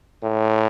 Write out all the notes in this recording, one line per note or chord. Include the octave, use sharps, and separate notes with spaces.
A2